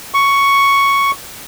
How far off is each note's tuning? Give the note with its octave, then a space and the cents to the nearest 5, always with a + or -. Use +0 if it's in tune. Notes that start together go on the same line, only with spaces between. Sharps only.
C#6 +5